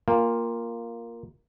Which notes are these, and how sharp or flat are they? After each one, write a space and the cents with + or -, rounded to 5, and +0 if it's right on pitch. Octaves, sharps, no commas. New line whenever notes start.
A#3 +0 F4 +0 G5 +40